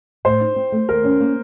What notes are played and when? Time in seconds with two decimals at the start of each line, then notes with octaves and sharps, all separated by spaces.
0.25 A2 C5
0.41 D#4
0.56 C4
0.72 A3
0.89 D#2 A#4
1.04 C#4
1.20 A#3